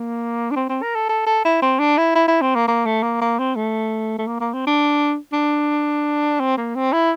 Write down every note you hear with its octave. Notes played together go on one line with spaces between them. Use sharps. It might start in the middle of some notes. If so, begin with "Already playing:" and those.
Already playing: A#3
D4
C4
C4
A#4
A4
A4
A4
E4
C4
D4
E4
E4
E4
C4
A#3
A#3
A3
A#3
A#3
C4
A3
A3
A#3
A#3
C4
D4
D4
C4
A#3
C4
E4